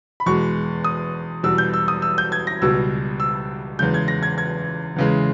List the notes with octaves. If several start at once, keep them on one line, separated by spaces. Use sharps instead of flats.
B5
E2 B2 G#3 C#6
D#6
E2 B2 G3 E6
G6
E6
D#6
E6
G6
G#6
A#6
C#2 B2 G3 E6
E6
E2 C#3 G#3 G6
G#6
A#6
G#6
G#6
E2 C#3 E3 G#3